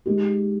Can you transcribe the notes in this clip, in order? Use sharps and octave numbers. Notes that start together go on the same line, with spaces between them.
G#3 D#4 G4